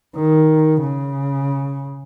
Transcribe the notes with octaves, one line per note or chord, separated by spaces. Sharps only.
D#3
C#3